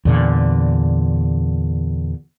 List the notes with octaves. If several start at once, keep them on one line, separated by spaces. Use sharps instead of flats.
E2 A#2 D3